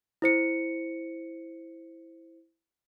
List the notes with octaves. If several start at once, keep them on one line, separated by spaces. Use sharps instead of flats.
E4 C5 C#7